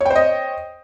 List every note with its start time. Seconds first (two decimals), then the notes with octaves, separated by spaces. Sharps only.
0.01 C#5
0.05 G5
0.10 C5
0.15 D#5